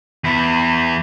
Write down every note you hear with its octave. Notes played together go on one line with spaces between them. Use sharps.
E2 E4